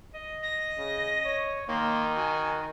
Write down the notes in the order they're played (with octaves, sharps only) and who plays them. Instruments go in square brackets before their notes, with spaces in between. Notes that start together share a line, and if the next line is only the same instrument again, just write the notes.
[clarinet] D#5
[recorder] A#6
[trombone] C#3
C#5
[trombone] D#3 [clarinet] A#3 [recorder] C6
[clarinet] F#4 [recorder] G#5